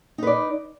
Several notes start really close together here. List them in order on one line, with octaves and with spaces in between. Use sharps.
D#4 B4 D5